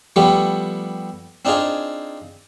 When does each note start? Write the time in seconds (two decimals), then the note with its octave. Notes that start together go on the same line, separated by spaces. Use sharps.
0.16 F3 G3 A3 B3 G4
1.45 C4 D4 D#4 F4 G#4